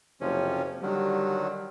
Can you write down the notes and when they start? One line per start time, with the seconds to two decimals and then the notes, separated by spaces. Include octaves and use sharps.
0.21 F#1 C3 F3 C#4
0.82 D3 D#3 F#3 G3